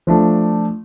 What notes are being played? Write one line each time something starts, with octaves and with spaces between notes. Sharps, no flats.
F3 A3 D4